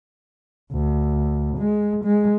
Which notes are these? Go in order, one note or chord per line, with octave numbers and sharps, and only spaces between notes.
D2
G#3
G#3